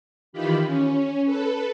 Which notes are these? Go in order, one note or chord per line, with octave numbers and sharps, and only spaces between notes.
D#3 E3 F4 G4 B5
C#4
A4 B4